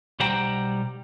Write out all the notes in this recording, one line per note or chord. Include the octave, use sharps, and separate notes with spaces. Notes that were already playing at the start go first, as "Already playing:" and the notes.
B1 G3 C5 F#5 G5 A#5